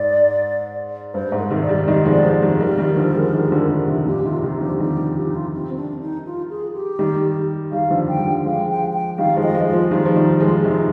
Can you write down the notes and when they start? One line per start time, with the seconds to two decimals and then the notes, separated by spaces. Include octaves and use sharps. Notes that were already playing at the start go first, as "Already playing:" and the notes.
Already playing: G#2 D5
1.14 G2 C5
1.32 G#2
1.39 A#4
1.50 C3 D#3
1.62 D5
1.69 D#3 G3
1.87 D#3 G3 D#5
2.05 F3 G#3
2.12 D5
2.24 F3 G#3
2.42 D#3 G3
2.60 D#3 G3 A#4
2.78 D#3 G3
2.97 D3 F3
3.15 F3 G#3
3.33 D#3 G3
3.52 D3 F3
3.70 D#3 G3
3.88 C3 D#3
3.99 C3
4.07 A#2 D3 G4
4.25 C3 D#3 F4
4.43 C3 D#3 D#4
4.61 D3 F3 G4
4.79 D#3 G3 G4
5.16 F4
5.25 D#4
5.35 F4
5.53 C4
5.77 D4
6.01 D#4
6.26 F4
6.50 G#4
6.74 G4
6.99 D#3 G3
7.72 D#3 G3 F5
7.90 D3 F3
8.09 G5
8.17 G3
8.27 D3 F3
8.45 F3 G#3 F5
8.69 G5
8.94 G5
9.18 D#3 G3 F5
9.36 F3 G#3
9.43 D#5
9.55 F3 G#3
9.67 F4
9.73 F3 G#3
9.91 D#3 G3 F4
10.06 F3
10.16 D#3 G3 D#4
10.40 F3 G#3 F4
10.64 C3 D#3 G4
10.71 G#4